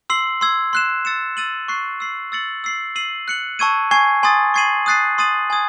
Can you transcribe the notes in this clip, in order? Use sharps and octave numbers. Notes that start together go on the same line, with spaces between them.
C6 E6 C7 F#7
C6 E6 G#6
C6 F#6 C7 E7
E6 A6 C#7 E7
E6 A6 D#7 F#7
C#6 F#6 C7
E6 C7 F#7
E6 A6 C#7 F#7
E6 C7 F#7
E6 C7 D#7 F#7
F#6 C#7 F#7
A5 C#6 E6 G#6 D#7
G#5 C#6 G#6 C7
G#5 C6 D#6 A6
C#6 G#6 C7 D#7 F#7
D#6 F#6 A6 C7 D#7
C6 D#6 A6 D#7 F#7
G#5 C6 D#6 G#6